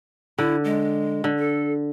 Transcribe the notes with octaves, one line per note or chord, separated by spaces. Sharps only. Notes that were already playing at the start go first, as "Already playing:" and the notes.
D3 E4
G#3
D3
A4